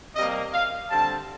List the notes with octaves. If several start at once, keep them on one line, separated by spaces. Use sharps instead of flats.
C3 G3 A#3 D#5
F5
D3 G3 C4 A5